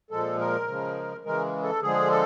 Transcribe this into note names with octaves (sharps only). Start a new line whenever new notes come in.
A#2 F3 G#3 A4
A#4
C#3 F3 G#3
C#3 E3 G#3 A#4
A4
D3 F3 G#3 G#4
A4